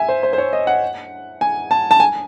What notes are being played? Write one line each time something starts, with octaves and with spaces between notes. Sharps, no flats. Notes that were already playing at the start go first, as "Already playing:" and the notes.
Already playing: E5 G#5
C5
C5
C5
C#5
D#5
F#5
G#5
A5
A5
G#5